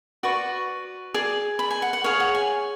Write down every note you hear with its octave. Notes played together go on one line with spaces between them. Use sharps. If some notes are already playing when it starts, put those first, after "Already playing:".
F#4 B4 D5 C#6
G#4 D5
B5
G#5
F#5
F#5
G#4 C#5 F5
F#5
G#5